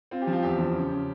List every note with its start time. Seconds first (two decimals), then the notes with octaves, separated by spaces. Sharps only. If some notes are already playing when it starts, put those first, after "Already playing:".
0.11 C4 F4
0.22 G4
0.27 F3
0.33 F4
0.43 E2 G4
0.59 F3
0.75 C#3
0.90 C#3